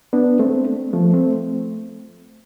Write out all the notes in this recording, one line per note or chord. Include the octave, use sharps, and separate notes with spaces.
B3 D4
A3 C4
F3 A3
A3 C4